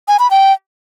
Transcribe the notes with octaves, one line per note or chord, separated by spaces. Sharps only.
G#5
B5
G5